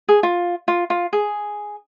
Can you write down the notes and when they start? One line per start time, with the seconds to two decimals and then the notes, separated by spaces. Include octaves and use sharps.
0.09 G#4
0.23 F4
0.68 F4
0.90 F4
1.13 G#4